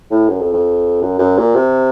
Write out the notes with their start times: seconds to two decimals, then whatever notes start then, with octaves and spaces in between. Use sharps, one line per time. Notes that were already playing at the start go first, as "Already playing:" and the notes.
0.11 A2
0.29 F#2
0.41 F2
0.53 F2
1.01 F#2
1.19 F#2
1.38 A#2
1.55 C3